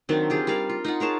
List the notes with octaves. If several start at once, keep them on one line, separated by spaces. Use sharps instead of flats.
D#3 F#3 C4 D4
F4 G4 G#4
G3 A#4 D5 F5
F4
D#4 F4 F#5
G#4 A#4 C#5 A5